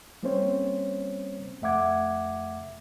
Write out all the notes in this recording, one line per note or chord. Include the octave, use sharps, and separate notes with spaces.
G3 A#3 C4 C#4 C5 C#5
F2 A3 E5 F#5 D6 G#6